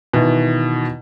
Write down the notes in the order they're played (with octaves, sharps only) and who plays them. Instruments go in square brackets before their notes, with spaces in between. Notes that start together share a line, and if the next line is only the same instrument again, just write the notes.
[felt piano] B2 D#3 E3